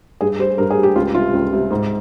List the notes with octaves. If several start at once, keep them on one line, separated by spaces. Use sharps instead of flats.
G2 G#4
G3 C5
G2 A#4
G#4
G3
G4
C#2 F4
C3 G3 F4
C#2
C3 G3
G#2